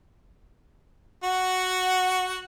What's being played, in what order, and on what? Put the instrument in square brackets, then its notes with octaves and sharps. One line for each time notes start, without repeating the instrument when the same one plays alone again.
[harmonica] F#4 F#5